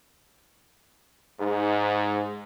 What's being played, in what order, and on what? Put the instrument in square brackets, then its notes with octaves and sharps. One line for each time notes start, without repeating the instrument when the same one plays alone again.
[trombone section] G#2